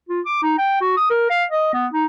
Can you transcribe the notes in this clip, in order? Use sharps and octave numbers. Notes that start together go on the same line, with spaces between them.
F4
D6
D#4
G5
F#4
D#6
A#4
F5
D#5
B3
D#4